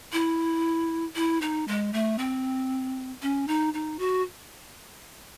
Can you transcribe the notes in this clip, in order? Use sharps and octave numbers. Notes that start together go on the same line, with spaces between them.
E4
E4
D#4
G#3
A3
C4
C#4
D#4
D#4
F#4